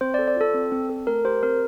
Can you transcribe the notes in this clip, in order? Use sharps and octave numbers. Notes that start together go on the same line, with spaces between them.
C4 C5
D5
A4
D5
F4 A4
C4
C4
A4
A3 A#4
G4 C5
C4 A#4